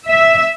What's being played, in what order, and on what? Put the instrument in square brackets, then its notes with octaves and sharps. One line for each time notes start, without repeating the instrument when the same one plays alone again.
[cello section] E5